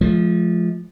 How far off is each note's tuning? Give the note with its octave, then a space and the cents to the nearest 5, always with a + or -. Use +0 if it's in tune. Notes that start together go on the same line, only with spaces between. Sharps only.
F3 +0 G#3 +45